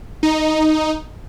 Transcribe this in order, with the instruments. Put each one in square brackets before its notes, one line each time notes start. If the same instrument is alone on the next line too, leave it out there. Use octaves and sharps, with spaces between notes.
[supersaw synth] D#4